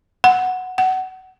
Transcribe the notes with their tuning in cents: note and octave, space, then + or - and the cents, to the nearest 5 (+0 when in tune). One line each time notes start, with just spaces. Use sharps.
F#5 -5
F#5 +25